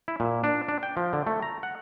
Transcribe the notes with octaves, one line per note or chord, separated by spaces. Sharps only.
E4
A#2
D4
D4
G5
F3
D3
A3
A#5
F#5